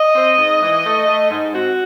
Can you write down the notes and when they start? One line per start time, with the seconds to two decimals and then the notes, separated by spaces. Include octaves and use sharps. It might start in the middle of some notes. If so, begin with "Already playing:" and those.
Already playing: D#5
0.15 C4
0.38 G#2
0.61 E3
0.84 A3
1.06 A3
1.30 G#2
1.53 C4 F#4